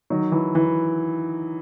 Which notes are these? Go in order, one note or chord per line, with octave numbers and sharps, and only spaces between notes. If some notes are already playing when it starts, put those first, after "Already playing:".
D#3 F#3
E3
E3